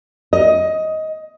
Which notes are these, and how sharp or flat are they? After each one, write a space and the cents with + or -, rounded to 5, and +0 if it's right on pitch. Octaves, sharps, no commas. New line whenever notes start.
D#5 +15